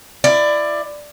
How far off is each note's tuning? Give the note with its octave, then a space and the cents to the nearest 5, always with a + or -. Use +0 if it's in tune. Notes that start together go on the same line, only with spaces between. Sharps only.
E4 +25 D5 +15